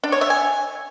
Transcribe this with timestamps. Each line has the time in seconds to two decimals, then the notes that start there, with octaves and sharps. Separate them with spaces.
0.04 D4
0.12 C#5
0.21 E5
0.30 G#5